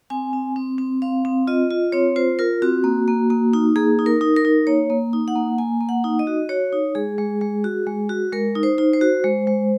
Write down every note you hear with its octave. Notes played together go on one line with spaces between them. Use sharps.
C4 G#5
C4
C4
C4
C4 F5
C4
F4 D#5
F4
C4 C#5
F4 C5
F4 A#4
C4 F#4
A#3
A#3
A#3
D#4
A#3 G#4
D#4
A#4
D#4
A#4
D#4
A#3 C#5
A#3
D#4
F#5
A#3
A#3 G#5
A#3
F#5
D#4
D#5
F#4
F#4 C#5
D#4
G#3 G#4
G#3
G#3
F#4
G#3
F#4
G#3 A#4
D#4
C5
D#4
C5
F#4
G#3
G#3